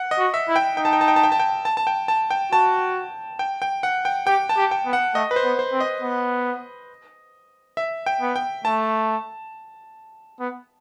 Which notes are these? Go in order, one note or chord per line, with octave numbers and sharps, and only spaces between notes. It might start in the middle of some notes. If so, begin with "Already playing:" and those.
Already playing: F#5
D#5
F#4
E5
E4
G5
D#4 G5
A5
G5
A5
G5
A5
G5
A5
G5
A5
A5
G5
A5
G5
F#4 A5
G5
G5
F#5
G5
G4 G5
A5
G4
G5
B3
F#5
A3 D#5
B4
C5
B3
C5
C4
D#5
B3
E5
G5
B3
G5
A3 A5
B3